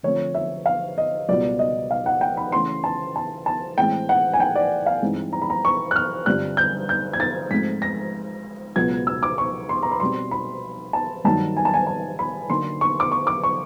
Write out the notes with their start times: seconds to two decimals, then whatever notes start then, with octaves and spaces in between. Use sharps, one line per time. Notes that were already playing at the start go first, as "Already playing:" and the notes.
0.03 D3 F3 A3 C4 C#5
0.34 E5
0.66 F5
0.98 D#5
1.29 C#2 B2 G3 B3 D5
1.59 D#5
1.91 F5
2.06 F#5
2.21 G5
2.37 B5
2.52 C#3 E3 A3 C#4 C6
2.84 A5
3.16 A5
3.46 A5
3.78 A2 E3 G#3 C4 G5
4.09 F#5
4.33 G#5
4.40 G5
4.55 D5
4.86 F5
5.02 G2 E3 G#3 C4 D#4
5.33 A#5
5.42 B5
5.50 A#5
5.65 C#6
5.91 F#6
5.96 F6
6.26 G2 D3 G3 C4 F4 F#6
6.57 G6
6.89 G6
7.13 G#6
7.20 A6
7.51 G#2 F3 A3 C4 F4 B6
7.82 A#6
8.76 C#2 B2 F#3 B3 G#6
9.07 E6
9.23 D6
9.38 C#6
9.69 C6
9.83 A#5
9.91 B5
10.00 B2 G3 C4 C6
10.31 B5
10.93 A5
11.25 G2 D#3 F#3 A#3 D#4 A5
11.57 G#5
11.65 A5
11.74 G#5
11.87 A5
12.19 B5
12.49 D3 F#3 A#3 D#4 C6
12.81 C#6
13.00 D6
13.12 C#6
13.27 D6
13.44 C#6